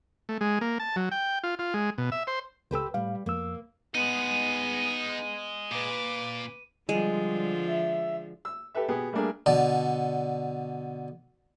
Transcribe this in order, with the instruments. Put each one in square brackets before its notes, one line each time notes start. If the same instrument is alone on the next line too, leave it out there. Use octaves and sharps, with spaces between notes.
[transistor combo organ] A3
G#3
A#3
A5
F#3
G5
F4
F4
G#3
B2
E5
C5
[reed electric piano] C#2 A4 E6 [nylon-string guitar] G4 B4 C5
[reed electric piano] A2 F5 [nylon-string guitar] G3
[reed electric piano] F2 E6 [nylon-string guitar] A#3
[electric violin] B3 [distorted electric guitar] D#4 F#5 [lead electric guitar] G#4 D#5 [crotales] D#7
[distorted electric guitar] A#2 [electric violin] B4 D6
[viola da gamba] D3 F3 [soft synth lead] G3 [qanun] G#3
[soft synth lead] E5
[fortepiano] E6
G4 A4 B4 E5
B2 B3 G4 G#4
G3 A3 A#3 D4 G#4 A#4
[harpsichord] B2 D3 D5 A5